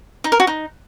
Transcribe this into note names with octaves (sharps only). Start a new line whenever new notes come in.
D#4
A#4
F#4
D#4